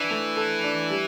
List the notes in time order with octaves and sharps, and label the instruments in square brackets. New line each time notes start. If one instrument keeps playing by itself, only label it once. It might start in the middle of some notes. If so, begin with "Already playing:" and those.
Already playing: [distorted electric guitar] E3 [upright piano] D4
[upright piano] A3
A4
D4
G3